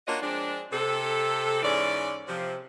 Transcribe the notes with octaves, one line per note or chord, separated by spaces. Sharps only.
A#3 D4 F4 F#4 C#5 D#5
F3 G#3 C4 D4
C3 A4
G#2 E3 C#4 D5
C3 F3